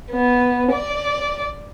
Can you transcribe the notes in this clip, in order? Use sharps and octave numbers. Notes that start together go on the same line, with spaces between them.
B3
D5